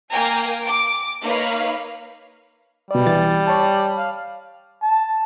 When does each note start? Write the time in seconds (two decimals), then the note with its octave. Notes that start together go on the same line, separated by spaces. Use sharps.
0.10 A#3 F5 G5 G#5 A#5
0.64 D6 D7
1.23 A#3 D#4 B4 C#5 F5 B5
2.91 B2 G3 D5
3.06 E3 A6
3.47 C#5 A5
3.98 F5
4.82 A5